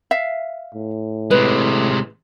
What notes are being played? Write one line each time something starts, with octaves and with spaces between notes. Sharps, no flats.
E5 F5
A2
C3 G#3 B4